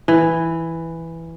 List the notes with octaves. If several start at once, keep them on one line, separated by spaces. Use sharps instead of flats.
E3